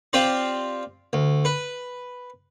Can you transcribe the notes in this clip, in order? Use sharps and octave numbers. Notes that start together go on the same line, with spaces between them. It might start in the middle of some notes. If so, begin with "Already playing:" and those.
C4 F4 G4 C5 D5
D2
B4